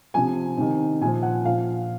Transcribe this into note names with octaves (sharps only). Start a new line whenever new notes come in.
C3 F3 G#5
C3 D#3
A#2 F3 G#5
F#5
A#2 F3 F5